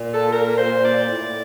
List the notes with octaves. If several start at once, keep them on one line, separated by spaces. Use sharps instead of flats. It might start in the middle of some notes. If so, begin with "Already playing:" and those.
Already playing: A#2
A4
A#4
C5
D5
A2